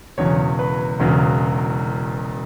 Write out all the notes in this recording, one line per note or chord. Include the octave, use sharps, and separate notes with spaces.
E1 E2 C#3 F#3 C#5
B4
E1 E2 C#3 F#3